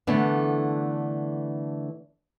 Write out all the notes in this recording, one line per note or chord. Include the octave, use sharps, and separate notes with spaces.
D3 E3 A3 B3 D4